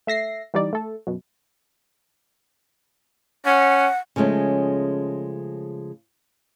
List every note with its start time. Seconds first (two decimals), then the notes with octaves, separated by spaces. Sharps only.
0.07 A3 E5 A#6 C7
0.54 E3 G3 D#4 D5
0.73 A3 A4
1.07 F#2 B2
3.46 C#4 F#5
4.16 C#3 F3 G#3 A3 C#4